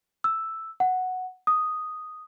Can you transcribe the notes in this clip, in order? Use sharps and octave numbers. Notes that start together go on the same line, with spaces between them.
E6
F#5
D#6